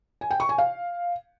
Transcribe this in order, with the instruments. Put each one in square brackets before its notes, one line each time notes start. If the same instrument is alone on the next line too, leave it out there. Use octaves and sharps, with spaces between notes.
[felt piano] G#5
G5
C#6
G#5
F5